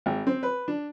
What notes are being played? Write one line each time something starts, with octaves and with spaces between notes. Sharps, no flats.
G#1
C4
B4
D4